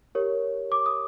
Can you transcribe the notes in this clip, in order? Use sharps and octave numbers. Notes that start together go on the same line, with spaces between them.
G4 A#4 C#5
D6
D#6